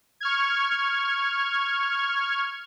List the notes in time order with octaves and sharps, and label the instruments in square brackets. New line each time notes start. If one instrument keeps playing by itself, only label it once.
[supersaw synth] C#6 F6 G#6